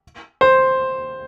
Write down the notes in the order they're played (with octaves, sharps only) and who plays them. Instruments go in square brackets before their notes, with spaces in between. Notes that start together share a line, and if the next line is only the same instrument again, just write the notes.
[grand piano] C5